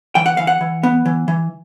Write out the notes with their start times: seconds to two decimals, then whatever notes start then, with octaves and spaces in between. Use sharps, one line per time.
0.15 E3 G5
0.26 F#5
0.37 E3 F5
0.47 F#5
0.61 E3
0.83 B3
1.05 E3
1.28 E3